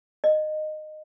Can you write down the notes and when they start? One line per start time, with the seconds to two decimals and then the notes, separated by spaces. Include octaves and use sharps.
0.24 D#5